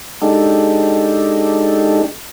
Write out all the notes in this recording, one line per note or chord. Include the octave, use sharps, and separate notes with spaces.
G#3 D4 D#4 G4 A4